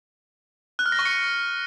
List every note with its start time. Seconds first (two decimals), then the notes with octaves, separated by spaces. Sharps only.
0.79 F#6
0.86 F6
0.92 A#6
0.99 C#6
1.05 C#7